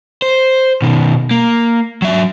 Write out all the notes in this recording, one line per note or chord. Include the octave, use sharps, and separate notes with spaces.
C5
B2 D#3
A#3
F#3 E5